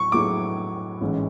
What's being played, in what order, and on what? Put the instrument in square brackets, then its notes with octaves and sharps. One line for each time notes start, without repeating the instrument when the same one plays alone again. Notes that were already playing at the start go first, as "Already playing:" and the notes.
Already playing: [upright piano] A2 F#3 E4 [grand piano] C#6
[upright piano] A2 F#3 B3 E4 G#4 [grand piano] D6
[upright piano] A1 G#2 G#3 C#4 E4